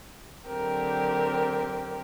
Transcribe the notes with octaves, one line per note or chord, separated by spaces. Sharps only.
D3 F#3 C4 G4 A#4